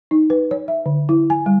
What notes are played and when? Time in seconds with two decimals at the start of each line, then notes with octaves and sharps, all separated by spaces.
0.11 D#4
0.30 B4
0.51 C#5
0.68 E5
0.86 D3
1.09 E4
1.30 G#5
1.46 G3